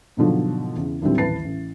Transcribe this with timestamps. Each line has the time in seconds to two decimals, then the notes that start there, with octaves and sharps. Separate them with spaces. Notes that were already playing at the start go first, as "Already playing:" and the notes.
0.17 G#2 B2 D3 F3 F#3
0.76 E2 C#3
1.02 D#2 A2 D3 F#3 G3 C4
1.18 D#1 A1 B4 A5 A6 C7
1.44 A1